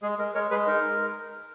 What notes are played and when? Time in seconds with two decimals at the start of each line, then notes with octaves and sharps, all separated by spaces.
0.02 G#3 G#4
0.19 G#3 A#4
0.34 G#3 A#4 C#5
0.51 G#3 G#4 B4
0.67 D#4 A#4